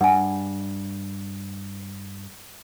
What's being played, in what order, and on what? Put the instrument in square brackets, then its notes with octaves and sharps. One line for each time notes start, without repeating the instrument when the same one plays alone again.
[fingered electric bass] G2 [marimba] F#5 G#5